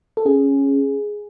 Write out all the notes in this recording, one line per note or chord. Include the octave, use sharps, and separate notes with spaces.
A4
C#4 G#4